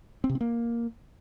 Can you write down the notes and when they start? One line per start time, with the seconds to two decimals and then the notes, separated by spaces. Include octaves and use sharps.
0.24 C4
0.29 C3
0.35 C4
0.41 A#3